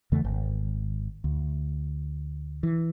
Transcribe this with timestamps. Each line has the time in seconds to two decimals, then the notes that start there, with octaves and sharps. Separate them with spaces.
0.12 E2 C#3 E3 A3
0.25 G#1
1.24 D2
2.63 E3